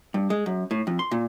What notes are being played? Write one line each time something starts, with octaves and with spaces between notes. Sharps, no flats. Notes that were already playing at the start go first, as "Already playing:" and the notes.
G2
G#3
F#2
A2
F2
C6
A#2